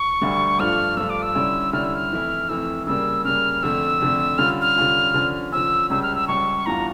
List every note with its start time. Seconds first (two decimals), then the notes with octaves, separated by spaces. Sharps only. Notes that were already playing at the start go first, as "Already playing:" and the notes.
Already playing: C#6
0.21 D2 D3 G3
0.59 G2 F3 A3 D4 F4 F6
0.97 G2 F3 A3 D4 F4 E6
1.10 D6
1.22 E6
1.35 D3 G3 C#4 E4
1.73 D3 G3 C#4 E4 F6
1.84 E6
1.95 F6
2.11 F2 E3 A3 E4
2.48 F2 E3 A3 E4 E6
2.87 C#3 G3 A#3 E6
3.24 C#3 G3 A#3 F6
3.62 F2 D3 A3 E6
4.01 F2 D3 A3
4.38 D3 G3 C#4 F4 F6
4.61 F6
4.76 D3 G3 C#4 F4
5.14 D3 F3 C#4
5.52 D3 F3 C#4 E6
5.90 C#2 C#3 G3 C#4 E6
6.03 F6
6.16 E6
6.28 C#2 C#3 G3 C#4 C#6
6.66 E2 E3 G3 D4 F4 A#5